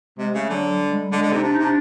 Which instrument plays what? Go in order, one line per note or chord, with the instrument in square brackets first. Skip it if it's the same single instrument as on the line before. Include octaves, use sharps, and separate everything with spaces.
[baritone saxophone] C3 [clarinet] G#3
[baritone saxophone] C#3 [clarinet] A3
[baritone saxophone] D3 [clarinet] F#3
[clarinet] G3
G#3
G3
[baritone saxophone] D3 [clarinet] G#3
[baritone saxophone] D3
[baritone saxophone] C3 [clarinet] D#4
[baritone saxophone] C3 [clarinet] D4
[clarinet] D#4
[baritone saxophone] C3
[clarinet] D4